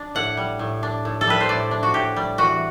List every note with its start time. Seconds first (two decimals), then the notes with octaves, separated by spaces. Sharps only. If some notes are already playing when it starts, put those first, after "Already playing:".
Already playing: D4
0.15 A2 F#5
0.37 G3
0.59 A2
0.83 D4
1.05 A2
1.21 A4
1.27 G3 B4
1.40 C5
1.49 A2 D5
1.71 D4
1.83 F#4
1.94 A2 G4
2.16 G3
2.38 E3 F#4